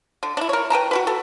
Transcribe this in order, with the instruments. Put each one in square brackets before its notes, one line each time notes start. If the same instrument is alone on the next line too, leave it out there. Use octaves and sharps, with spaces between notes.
[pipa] D3
D4 E4
A#4 C#5
B4 G5 A5 A#5
F#4 G4 B4
A4